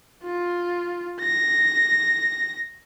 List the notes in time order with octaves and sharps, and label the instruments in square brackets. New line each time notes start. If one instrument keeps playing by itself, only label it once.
[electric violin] F4
A#6